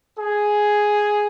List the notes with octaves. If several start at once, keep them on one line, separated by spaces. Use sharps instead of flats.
G#4